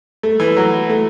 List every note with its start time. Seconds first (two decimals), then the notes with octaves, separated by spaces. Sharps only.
0.23 A3
0.40 E3
0.57 F#3
0.90 A3